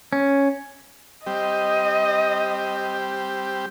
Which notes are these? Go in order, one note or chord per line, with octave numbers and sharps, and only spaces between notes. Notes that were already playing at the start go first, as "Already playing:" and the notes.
C#4
G3 C4 G4 D#5